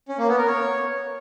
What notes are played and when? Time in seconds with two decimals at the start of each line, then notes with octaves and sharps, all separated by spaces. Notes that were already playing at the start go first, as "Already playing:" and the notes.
0.09 C#4
0.18 A#3
0.28 B3
0.38 A#4
0.47 C#5